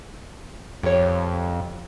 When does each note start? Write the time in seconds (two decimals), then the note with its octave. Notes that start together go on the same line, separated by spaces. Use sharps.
0.83 F2 G4 C#5